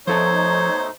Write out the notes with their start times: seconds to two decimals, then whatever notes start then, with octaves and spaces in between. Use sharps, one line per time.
0.07 B2 F3 A3 D#4 A4 C5 C#5 A5